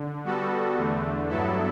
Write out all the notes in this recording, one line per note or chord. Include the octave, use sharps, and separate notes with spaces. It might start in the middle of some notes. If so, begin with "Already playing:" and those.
Already playing: D3
G3 B3 F#4 A4
E2 D3 A3
G2 F#3 B3 E4 A4